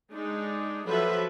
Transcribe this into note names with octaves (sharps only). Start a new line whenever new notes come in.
G#3 D4 D#4
F3 F#3 A4 B4 C5 E5